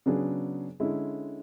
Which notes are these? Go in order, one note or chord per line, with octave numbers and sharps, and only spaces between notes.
C#3 F#3 B3 D4 G#4
D3 G#3 C#4 E4